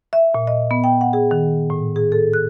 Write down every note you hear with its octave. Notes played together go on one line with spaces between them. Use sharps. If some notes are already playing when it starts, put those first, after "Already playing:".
E5
A#2
D#5
B3
G5
F#5
G#4
D#3
A2
G#4
A4
F#6